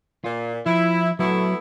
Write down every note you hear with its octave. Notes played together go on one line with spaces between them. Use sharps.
A#2 F4
F3 E4
F#3 A3 B3 E4 A4 C#5